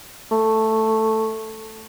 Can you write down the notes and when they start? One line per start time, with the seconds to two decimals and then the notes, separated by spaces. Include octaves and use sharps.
0.32 A3